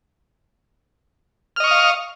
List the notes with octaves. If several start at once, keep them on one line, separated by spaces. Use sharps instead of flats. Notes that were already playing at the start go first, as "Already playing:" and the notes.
D#5 F5 C#6 D#6 F6